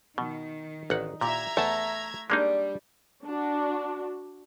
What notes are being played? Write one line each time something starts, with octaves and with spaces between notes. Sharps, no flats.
B2 D#3
A1 D#4 F#5
A#2 E4 G4 E5 A#5 G#6
E2 A3 A5
G3 G#3 A#3 D4 D#4
D4 F#4